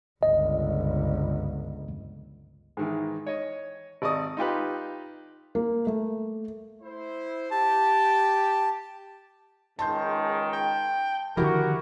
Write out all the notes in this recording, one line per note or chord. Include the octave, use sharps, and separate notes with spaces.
G1 C#2 D#5
G#2 D#3 E3
C#5 D#5
G#1 D5 D#5 C#6 D#6
D#4 F4 G4 B4
A#3
A3
E4 C5
G4 A5
C#2 G#2 D#3 A5 C6 G6
G5
D3 D#3 F3 E4 F#4 G4 A#4